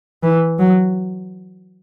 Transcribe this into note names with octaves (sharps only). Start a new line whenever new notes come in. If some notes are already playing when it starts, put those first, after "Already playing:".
E3
F#3